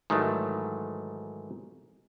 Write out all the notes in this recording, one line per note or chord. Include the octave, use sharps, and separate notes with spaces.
G#2 D#3 E3 F#3 A3